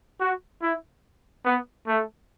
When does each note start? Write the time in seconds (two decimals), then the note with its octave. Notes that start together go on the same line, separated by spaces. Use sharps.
0.21 F#4
0.63 E4
1.46 B3
1.88 A3